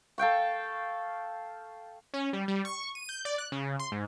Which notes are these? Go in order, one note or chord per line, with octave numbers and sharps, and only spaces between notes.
A4 F5 G5 C#6
C#4
G3
G3
C#6
D#7
G6
D5
F#6
C#3
C6
G#2